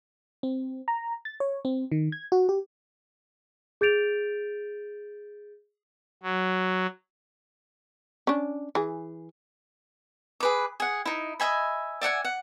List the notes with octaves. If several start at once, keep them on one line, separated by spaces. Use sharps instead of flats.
C4
A#5
A6
C#5
C4
D#3
G#6
F#4
G4
G#4 G6 A6 D7 F7
F#3
C#4 D4
E3 G#4
G#4 B4 D6
G#4 F#5
D#4 E4
D#5 E5 G#5 B5
D5 E5 F#5 G#5
F#5